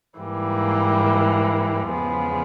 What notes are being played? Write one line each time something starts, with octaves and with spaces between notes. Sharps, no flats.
G#2 E3 G3 A#3
E2 C#3 F3 G#3 B3